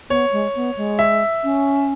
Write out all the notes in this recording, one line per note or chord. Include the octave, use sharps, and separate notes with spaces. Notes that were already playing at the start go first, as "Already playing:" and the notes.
B3 C#5
G#3
B3
G#3
E5
C#4